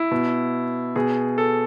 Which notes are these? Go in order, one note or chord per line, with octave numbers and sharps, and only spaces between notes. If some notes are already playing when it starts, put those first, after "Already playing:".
Already playing: E4
B2
B2 G#4
A4